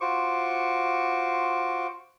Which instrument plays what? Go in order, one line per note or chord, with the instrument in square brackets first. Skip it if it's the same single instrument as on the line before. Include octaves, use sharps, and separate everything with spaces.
[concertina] F4 F#4 C5 C#6 D6